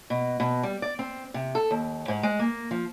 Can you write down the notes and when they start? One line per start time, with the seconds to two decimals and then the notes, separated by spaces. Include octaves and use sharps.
0.10 B2
0.40 B2
0.63 G3
0.82 D5
0.99 C4
1.34 C3
1.55 A4
1.71 D#2
2.08 G#2
2.23 G#3
2.39 A#3
2.71 F3